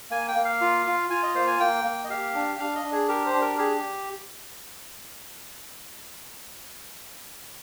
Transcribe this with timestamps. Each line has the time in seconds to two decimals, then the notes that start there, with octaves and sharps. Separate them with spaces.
0.11 A#3 G#5
0.28 G5
0.36 A#3
0.45 F5
0.61 F4
0.86 F4
1.10 F4 G#5
1.23 D#5
1.35 A#3 C5
1.47 G#5
1.60 A#3 G5
1.84 A#3
2.04 D#5
2.10 G4 F5
2.34 D4
2.59 D4 F5
2.75 D#5
2.85 D4
2.92 G#4
3.08 G4 A#4
3.26 C5
3.34 D4
3.41 A#4
3.58 G4 G#4